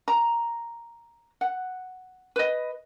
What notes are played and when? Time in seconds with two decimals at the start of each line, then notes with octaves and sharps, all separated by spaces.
0.08 A#5
1.41 F#5
2.36 B4 D#5